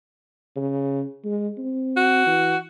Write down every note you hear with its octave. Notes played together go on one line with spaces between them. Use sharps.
C#3
G#3
C4
F#4
E3